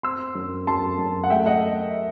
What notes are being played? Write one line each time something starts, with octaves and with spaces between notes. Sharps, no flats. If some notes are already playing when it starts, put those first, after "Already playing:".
C4 C6 E6
F#2
F#2 A5 C6
F#2
F#5
A3 E5 G5
D#5 F#5